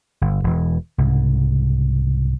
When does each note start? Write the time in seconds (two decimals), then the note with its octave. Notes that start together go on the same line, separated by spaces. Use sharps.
0.21 G1
0.44 E1 E3
0.98 C2 G#2 C#3